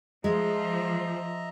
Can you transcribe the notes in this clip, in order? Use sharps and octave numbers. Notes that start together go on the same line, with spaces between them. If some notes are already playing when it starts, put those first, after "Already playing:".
F3 G#3 D#5 E5 A#5